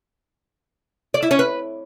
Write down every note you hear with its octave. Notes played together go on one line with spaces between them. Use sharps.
D5
E4
C#4
B4